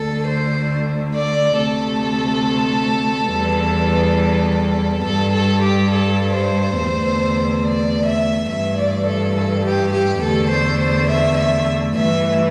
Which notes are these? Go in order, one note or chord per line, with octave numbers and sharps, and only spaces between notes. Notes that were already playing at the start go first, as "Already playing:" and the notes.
Already playing: D2 D3 A3 A4
C5
D5
D2 C3 A3 A4
E2 E3 G3
G2 G3 A4
A4
G4
A4
C5
E2 D3 A3
D5
E5
G2 E3 A3 E5
D5
A4
A4
G4
G4
E2 D3 A3 A4
C5
C5
E5
E5
G2 E3 A3 E5